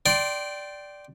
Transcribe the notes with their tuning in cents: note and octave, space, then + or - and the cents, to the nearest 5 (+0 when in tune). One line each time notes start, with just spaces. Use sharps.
D5 +0 G5 -15 C6 +0